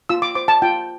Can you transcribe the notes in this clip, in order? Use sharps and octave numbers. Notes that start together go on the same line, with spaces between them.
F4 E6
D6
C5 D6
A5
F4 G5